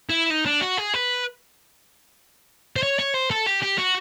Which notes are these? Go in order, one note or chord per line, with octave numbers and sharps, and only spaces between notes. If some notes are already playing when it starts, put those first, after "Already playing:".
E4
D#4
D4
F#4
G#4
B4
C5
C#5
C#5
C5
A4
G4
G4
F#4